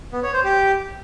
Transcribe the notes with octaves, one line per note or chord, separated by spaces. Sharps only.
B3
C#5
C5
G4